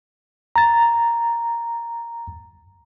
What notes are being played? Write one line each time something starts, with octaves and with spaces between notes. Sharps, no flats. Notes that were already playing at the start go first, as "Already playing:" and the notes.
A#5 A6